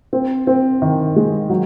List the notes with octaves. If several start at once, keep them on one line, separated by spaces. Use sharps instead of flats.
C4
C4
D#3
G#3
F#3